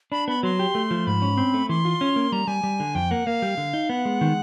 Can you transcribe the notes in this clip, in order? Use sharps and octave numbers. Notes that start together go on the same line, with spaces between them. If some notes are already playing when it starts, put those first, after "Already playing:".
D4 B5
B3 B5
F#3 C6
G4
A3
F3
G#2 B5
C#4
C4
A3
E3 C6
F4
C#4
A#3
G3 A#5
G3 G#5
G3
D3
F2 G5
A#3 F#5
A#3 F5
G3
D3
D#4
B3 F#5
G#3
D#3